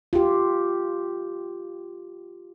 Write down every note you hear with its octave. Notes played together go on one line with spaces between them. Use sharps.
F4 G4